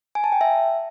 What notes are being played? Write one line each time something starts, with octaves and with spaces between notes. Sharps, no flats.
G#5
A5
G5
E5